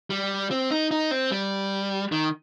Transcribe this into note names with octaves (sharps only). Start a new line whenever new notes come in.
G3
C4
D#4
D#4
C4
G3
D#3